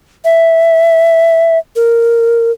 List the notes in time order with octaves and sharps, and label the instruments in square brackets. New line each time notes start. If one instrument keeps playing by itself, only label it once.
[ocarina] E5
A#4